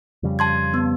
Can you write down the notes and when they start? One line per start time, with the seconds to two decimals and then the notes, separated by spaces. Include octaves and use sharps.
0.23 F2 C#3 G3
0.39 A5 C6 G#6
0.74 B3